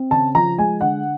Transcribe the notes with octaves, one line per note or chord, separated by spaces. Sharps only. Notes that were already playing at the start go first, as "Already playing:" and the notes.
Already playing: C4
C#3 A5
F3 A#5
G#3 G#5
D3 F#5